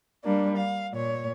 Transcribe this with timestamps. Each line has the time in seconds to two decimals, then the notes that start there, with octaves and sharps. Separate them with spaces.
0.23 G3 A#3 D4
0.57 F5
0.94 A#2 C#5